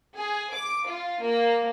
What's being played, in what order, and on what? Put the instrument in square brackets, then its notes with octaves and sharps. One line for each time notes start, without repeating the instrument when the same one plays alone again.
[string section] G#4
D6
F4
A#3